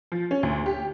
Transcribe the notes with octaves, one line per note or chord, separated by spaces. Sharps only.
F3
C#4
D2
G4